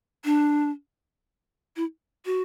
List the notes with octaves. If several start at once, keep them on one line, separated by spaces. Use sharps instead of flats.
D4
E4
F#4